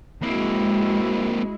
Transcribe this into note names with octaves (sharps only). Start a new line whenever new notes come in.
G#3 A#3 C4 E4 F#4